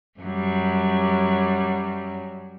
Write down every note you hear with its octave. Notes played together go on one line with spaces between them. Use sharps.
F#2 F#3 G3